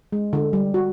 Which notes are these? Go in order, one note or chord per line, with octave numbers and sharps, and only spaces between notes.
G#3
D3
G3
F#4